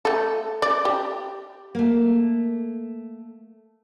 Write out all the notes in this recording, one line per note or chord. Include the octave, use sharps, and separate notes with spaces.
A3 A4
D5
G4
A3 A#3